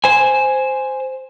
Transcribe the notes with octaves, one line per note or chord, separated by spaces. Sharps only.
C5 G#5